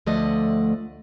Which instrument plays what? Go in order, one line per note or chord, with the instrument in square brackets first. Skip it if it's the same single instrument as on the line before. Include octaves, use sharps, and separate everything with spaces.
[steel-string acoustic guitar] D2 F3 A3 D5 D#5 F#5